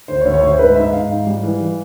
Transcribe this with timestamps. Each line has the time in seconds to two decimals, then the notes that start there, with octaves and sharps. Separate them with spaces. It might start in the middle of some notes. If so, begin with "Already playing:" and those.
0.08 D2 C5
0.21 C#5
0.25 D2
0.34 C#5
0.42 D2 C5
0.59 G#2 B4
0.76 G#2 E5
0.93 G#2 F5
1.09 G#2
1.27 G3
1.43 E3
1.60 E3